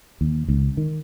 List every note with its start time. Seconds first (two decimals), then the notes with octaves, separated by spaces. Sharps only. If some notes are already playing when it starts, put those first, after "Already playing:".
0.21 D#2
0.48 C#2
0.77 D#3